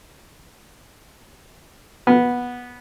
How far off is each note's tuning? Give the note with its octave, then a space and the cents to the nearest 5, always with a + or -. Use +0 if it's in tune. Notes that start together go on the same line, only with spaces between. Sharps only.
B3 -15